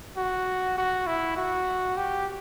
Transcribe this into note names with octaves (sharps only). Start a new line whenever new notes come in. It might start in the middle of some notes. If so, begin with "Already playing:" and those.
F#4
F#4
E4
F#4
G4